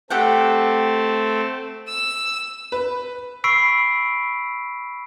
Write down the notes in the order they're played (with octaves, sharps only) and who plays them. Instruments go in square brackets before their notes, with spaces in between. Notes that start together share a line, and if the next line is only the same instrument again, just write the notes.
[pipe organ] A3 C4 A4 [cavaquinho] G4 F#5 G5
[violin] E6
[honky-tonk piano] B4
[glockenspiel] B5 C#6 E6 B6 C7 D7